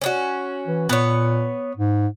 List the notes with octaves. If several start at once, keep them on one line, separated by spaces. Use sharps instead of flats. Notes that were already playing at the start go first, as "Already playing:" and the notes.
C#4 D#4 F#4
E3
A#2 B3 C#5
G#2